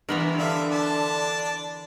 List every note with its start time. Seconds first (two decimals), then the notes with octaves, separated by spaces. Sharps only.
0.09 G2 E3 B3 A#4
0.39 D3 E5 F5
0.71 D4 A5